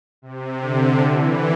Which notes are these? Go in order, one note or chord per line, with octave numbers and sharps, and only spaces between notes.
C3
D3
E3